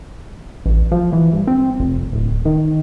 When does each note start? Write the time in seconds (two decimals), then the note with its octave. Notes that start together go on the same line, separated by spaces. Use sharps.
0.66 A1
0.92 F3
1.13 E3
1.33 G2
1.47 C4
1.80 F1
2.12 D1
2.45 D#3